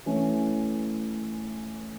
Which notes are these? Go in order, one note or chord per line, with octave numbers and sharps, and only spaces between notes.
E3 A3 C#4